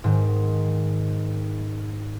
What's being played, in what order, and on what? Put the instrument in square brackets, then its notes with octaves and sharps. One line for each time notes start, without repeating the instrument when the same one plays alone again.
[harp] G#2 D#3